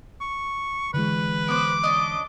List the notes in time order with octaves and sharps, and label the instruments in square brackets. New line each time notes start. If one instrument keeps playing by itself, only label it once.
[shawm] C#6
[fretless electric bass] D3 E3 G#3 [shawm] B4
[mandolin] B3 C5 [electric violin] D6
[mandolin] C#4 D4 D#5